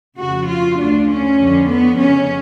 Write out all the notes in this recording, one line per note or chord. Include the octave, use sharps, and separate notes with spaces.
F2 C#3 F#4
F4
D2 D3 D4
C#4
F2 D3
B3
F2 C#3 C#4